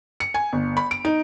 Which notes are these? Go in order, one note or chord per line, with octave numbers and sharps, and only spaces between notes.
C#7
G#5
G1
B5
D7
D#4